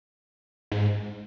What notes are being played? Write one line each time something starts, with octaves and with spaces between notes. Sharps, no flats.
G#2